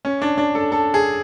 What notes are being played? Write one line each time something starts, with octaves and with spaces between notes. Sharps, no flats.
C#4
D4
D4
A4
A4
G#4